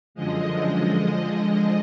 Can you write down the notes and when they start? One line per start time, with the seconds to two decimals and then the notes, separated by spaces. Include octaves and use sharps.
0.15 F#2 D3 F3 G#3 D#5
0.54 D#5
0.94 D3 F3 G#3